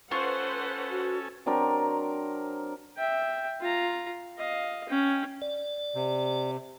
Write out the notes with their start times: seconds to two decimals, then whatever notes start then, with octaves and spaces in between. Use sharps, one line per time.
0.11 C#4 F4 A4 B4 C5 F#5 C#6
0.91 F#4
1.46 F#3 C4 D4 A#4
2.97 E5 G5
3.60 F4 A#5
4.38 D#5 F5
4.89 C#4 G5
5.42 D5
5.95 C3